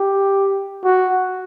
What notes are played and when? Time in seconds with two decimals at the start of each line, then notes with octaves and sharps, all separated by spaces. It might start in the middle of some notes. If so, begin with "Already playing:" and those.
Already playing: G4
0.84 F#4